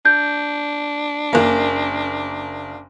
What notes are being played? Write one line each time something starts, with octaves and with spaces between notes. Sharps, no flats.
D4 G6
F#1 A#3